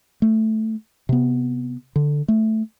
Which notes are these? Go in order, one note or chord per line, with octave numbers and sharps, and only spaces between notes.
A3
C3 B3
D3
A3